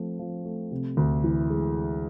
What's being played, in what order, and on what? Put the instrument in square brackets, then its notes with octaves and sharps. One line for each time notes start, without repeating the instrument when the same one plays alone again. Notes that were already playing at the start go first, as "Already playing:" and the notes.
Already playing: [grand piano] F3 A3 C4
F3
A3
C3
D2
E3
G#3